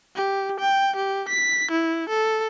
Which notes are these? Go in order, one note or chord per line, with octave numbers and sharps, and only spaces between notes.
G4
G5
G4
B6
E4
A4